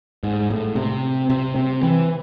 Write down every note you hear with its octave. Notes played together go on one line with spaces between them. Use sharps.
G#2
A2
C3
C3
C3
E3